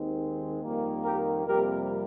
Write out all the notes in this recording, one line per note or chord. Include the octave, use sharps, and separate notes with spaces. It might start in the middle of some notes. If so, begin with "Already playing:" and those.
Already playing: D#2 D#3 G#3 C4
F2 D#3 G3 A#3
G4 A#4
F2 C3 G3 A#3 G4 A#4